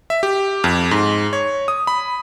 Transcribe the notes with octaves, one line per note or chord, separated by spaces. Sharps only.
E5
G4
F2
G#2
C#5
D#6
B5